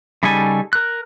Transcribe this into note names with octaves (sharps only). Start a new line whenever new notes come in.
C#3 G3 D#4 A4 G#5
A#4 F#6